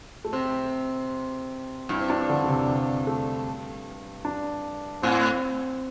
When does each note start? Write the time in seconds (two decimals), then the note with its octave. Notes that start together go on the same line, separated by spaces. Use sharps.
0.25 A3
0.33 C3 C4
1.89 G2 E4
2.01 C4
2.10 D4
2.29 D3
2.44 D3
2.49 C3
3.07 A3
4.25 D4
5.02 A2 C4